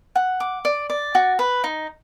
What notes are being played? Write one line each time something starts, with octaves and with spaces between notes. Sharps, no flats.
F#5
D6
D5
D5
F#4
B4
D#4